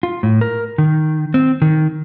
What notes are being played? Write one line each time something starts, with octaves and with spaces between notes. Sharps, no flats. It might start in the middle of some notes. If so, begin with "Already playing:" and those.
F4
A2
A#4
D#3
C4
D#3